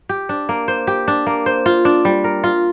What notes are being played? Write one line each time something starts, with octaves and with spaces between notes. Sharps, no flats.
G4
D4
A#3
C5
G4
D4
A#3
C5
F4
D4
G3
A#4
F4